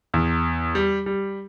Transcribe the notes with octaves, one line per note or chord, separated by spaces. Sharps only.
E2
G3
G3